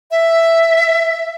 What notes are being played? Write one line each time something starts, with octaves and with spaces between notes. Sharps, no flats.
E5